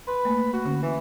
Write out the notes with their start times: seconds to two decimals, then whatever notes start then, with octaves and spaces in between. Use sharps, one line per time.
0.07 B4 C6
0.25 A3 A#3
0.53 F#4
0.65 D3 C#4
0.82 E3